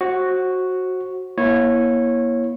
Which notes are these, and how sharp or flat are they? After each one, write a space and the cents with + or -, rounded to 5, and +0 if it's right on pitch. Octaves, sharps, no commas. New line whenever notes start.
F#4 +0 C5 +35
A#3 +40 E4 +0 C#5 -15